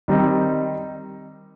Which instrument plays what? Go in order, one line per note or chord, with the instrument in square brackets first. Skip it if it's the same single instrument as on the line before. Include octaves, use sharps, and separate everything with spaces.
[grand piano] D#3 G3 C4 D#4